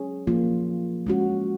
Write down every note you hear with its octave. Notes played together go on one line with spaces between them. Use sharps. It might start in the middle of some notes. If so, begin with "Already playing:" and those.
Already playing: F#3 C#4 G#4 C#5
F3 A#3 F4
G#3 C#4 F#4